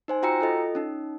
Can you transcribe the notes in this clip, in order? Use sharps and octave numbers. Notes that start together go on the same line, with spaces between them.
D#4 C5 G#5
F4 F#4 G5 A#5 E6 C#7
F4 A4 D#5
C#4 D#4